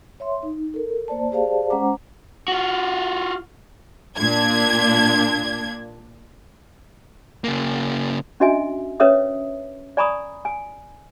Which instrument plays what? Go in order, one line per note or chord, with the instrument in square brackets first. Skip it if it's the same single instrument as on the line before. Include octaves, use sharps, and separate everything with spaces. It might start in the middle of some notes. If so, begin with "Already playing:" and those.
[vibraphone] C#5 E5 C6
D#4
A4 A#4
A#3 C5 D5 A5
G4 G#4 C5 D5 F5 A5
G#3 C#4 C5 F#5 A#5 D6
[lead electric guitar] F4 F#4
[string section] A#2 D4 G#6
[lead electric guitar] C#3 A#3
[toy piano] C#4 D4 F#4 D#5 E5 G#5
C#4 A#4 B4 C#5 E5 D#6
D5 G#5 A#5 B5 C#6 D#6
G#5